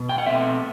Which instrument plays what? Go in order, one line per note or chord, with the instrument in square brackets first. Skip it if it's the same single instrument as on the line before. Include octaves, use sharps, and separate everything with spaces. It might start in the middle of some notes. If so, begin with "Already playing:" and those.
Already playing: [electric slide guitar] B2
G5
F#5
B2 A3 C4 E5